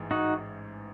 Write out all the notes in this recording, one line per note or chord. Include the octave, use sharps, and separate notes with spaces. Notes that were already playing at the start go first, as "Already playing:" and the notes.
Already playing: A1 G#2 E3 G#3
D#4 F#4